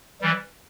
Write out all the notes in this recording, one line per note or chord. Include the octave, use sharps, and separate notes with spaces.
E3 G3